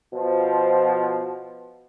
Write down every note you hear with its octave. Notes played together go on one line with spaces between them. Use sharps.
B2 F3